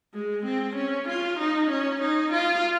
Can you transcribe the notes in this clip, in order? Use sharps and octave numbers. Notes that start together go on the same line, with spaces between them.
G#3
C4
C#4
F4
D#4
C#4
D#4
F4